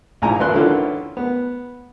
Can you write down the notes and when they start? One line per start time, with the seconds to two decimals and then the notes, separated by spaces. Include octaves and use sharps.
0.22 A#1 G#2 E4 G#5 A#5
0.40 G#1 B4 C6 F#6
0.54 D3 D#3 C#4 E4 F4 B4
1.17 B3